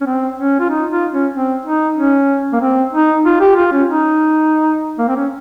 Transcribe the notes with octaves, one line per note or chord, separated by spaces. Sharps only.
C#4
C4
C#4
F4
D#4
F4
C#4
C4
D#4
C#4
A#3
C4
D#4
F4
G4
F4
C#4
D#4
A#3
C4
C#4